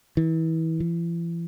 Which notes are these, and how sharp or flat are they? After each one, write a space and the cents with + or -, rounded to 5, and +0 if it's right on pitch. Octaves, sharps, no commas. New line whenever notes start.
E3 -30
E3 +40